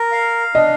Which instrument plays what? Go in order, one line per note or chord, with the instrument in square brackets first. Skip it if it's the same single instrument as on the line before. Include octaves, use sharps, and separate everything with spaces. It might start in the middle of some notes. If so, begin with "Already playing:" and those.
Already playing: [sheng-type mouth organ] A#4
F5
[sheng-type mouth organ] D4 [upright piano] D#5